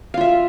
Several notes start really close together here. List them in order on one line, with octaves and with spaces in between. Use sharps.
F5 F4 E5